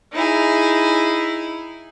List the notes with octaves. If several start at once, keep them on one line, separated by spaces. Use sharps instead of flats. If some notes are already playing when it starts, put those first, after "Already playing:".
D#4 E4 G#4